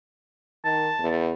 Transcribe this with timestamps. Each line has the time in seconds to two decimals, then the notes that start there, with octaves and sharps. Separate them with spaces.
0.65 D#3 A5
1.00 E2